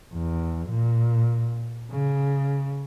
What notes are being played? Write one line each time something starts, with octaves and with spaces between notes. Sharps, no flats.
E2
A#2
C#3